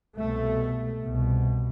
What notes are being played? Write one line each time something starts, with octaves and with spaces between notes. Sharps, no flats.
C2 B2 A3
C2 B2